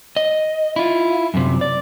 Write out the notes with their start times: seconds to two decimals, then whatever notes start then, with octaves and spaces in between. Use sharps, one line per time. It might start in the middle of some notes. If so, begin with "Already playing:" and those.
0.16 D#5
0.76 E4 F4
1.34 F#2 C3
1.61 D5